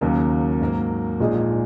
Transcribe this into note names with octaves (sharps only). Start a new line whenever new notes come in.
D#2 C#3 F#3 A#3
G#2 F#3 A#3
A#1 A#2 G#3 D#4 G#4